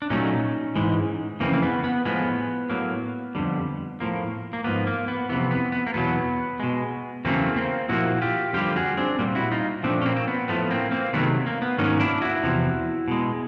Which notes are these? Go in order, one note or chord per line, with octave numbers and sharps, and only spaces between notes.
D4
A#2 F#3 A3 C#4 D#4
G#2 E3 G#3
F2 C#3 E3 A#3 C4
A#3
B3
B3
A2 F3 G#3 B3
A2 F#3 A#3
F2 D3 G3
A2 F3 A#3
A#3
G#2 F3 A#3 B3
A#3
B3
F2 C3 E3 B3
B3
B3
A#3
E2 B2 F#3 B3
B2 G#3
E2 C#3 F#3 A3 A#3 C4
A#3 C4
A#2 F3 A#3 E4 F#4
F4 G4
F2 D3 G3 A#3 F4 G4
F#4 G#4
C4 D4
A#2 G3 A#3 C4
E4 F#4
D#4 F4
A#2 F3 A3 C4 D4
C#4
A#3 C4
C4
B3
A2 F3 A3 B3
A#3 C4
A#3 C4
C3 D#3 F#3 A3 B3
A#3
B3
G#2 D#3 F#3 A#3 C#4 D#4
D4 E4
E4 F#4
E2 C3 F3
B2 G#3